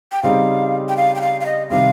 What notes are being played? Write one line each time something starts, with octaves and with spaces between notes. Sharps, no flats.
G5
C#3 G3 C4 D#4 F5
G5
F5
G5
F5
F5
D#5
C3 D#3 G3 C4 F5